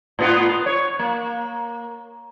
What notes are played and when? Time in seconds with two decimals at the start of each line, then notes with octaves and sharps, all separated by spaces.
0.19 A2 B3 F4
0.66 C#5
0.99 A#3